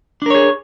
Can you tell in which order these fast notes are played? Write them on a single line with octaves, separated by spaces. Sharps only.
D4 A#4 C#5 G#4